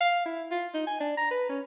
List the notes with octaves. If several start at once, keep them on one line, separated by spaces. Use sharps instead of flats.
F5
E4
F4
D#4
G#5
D4
A#5
B4
C#4